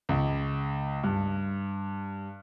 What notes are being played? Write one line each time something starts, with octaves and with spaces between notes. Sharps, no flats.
C#2
G2